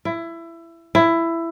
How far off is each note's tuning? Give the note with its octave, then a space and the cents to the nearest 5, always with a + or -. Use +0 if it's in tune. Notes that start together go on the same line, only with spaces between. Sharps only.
E4 +20
E4 +15